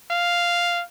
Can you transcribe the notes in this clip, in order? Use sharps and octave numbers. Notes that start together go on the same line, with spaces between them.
F5